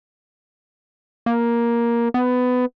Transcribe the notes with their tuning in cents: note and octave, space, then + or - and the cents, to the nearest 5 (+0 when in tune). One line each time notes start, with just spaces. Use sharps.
A#3 +10
B3 +20